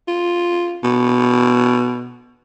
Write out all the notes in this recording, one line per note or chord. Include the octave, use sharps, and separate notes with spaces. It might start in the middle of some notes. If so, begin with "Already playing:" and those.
F4
B2